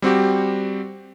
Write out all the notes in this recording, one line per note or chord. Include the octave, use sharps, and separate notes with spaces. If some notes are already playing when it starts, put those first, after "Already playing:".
G3 C4 F#4 G4